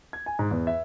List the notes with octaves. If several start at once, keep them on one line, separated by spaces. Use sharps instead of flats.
G#6
G#5
G#2
E2
E5